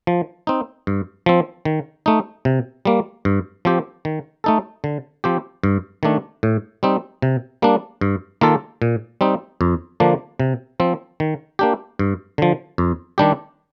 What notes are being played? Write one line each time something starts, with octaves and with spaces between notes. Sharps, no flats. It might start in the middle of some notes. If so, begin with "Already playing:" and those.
F3
C4 D#4
G2
F3 C4
D#3
A3 D#4
C3
G3 A#3
G2
F3 C4 G4
D#3
A3 D#4 A4
D3
F3 C4 G4
G2
D#3 A3 D4
A2
G3 C4 D#4
C3
G3 A#3 D4
G2
D#3 A#3 F4 A4
A#2
G3 C4 D#4
F2
D3 F3 A#3 D4
C3
F3 C4
D#3
A#3 D4 G4
G2
D3 F3
F2
D#3 G3 D4 G4